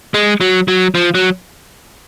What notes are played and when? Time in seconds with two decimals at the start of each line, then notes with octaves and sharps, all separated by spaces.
0.14 G#3
0.41 F#3
0.68 F#3
0.95 F3
1.15 F#3